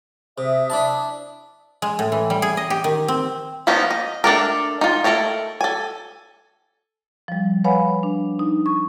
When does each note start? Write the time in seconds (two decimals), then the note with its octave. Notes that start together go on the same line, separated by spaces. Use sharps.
0.38 C3 E5 D#6
0.70 D4 E4 A5
1.82 G#3
1.99 A2
2.12 E3
2.30 G3
2.42 G#4
2.57 D#5
2.70 G4
2.84 D#3
3.08 C4
3.67 F3 A#3 B3 C#4 D#4
3.91 D#5
4.24 A3 D4 A4 A#4
4.81 D#4 F4
5.04 A3 F4 A4 A#4 C#5
5.61 A4 G#5
7.28 F3 G3
7.64 B4 C#5 F5 F#5 G#5 B5
8.03 D4
8.39 D#4
8.66 C#6